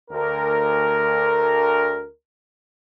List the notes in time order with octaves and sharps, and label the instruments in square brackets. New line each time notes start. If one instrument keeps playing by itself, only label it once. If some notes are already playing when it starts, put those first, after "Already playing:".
[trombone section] D2 A#4